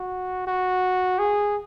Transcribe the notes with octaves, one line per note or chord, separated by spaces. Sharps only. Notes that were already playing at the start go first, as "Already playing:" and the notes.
Already playing: F#4
F#4
G#4